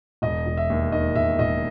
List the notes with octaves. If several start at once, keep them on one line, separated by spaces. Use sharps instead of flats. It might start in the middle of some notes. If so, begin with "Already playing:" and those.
E1 D#5
E1
E5
D#2
D#3 D#5
E1 E5
E1 D#5